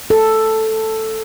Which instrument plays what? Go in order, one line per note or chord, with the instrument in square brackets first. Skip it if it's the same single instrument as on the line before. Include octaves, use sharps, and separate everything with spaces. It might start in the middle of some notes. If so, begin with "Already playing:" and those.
[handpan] A4